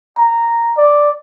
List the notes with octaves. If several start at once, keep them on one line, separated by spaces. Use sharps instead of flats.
A#5
D5